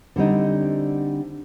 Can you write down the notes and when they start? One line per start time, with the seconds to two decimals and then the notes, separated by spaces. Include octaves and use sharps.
0.16 D3 G3 C4 D#4